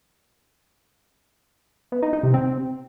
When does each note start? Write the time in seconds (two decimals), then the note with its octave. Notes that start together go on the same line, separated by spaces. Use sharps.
1.92 B3
2.03 D#4
2.13 D#4
2.23 C3
2.34 C4